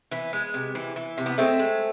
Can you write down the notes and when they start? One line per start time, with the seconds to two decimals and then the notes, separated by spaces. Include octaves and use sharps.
0.11 E3 B3
0.33 G#3
0.54 C3
0.75 E3
0.96 E3
1.18 C3
1.26 B3
1.38 G#3 A3 C4
1.59 G#3